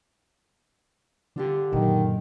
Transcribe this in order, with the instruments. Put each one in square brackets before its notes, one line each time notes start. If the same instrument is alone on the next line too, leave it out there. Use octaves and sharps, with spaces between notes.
[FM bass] D3 [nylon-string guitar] D4 F4 G4
[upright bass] F#2 A#2 [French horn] D#3